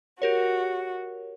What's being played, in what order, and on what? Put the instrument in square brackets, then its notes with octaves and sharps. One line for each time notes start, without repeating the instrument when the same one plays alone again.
[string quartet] F#4 [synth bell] G4 A#4 C#5